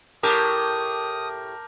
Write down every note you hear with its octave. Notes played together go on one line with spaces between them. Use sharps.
A2 G4 A#4 A5 D6 D#6 G6